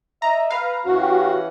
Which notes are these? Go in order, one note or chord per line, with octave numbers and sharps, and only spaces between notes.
D#5 E5 A#5
B4 F5 A#5
F#2 E3 C#4 F#4 F#5
G4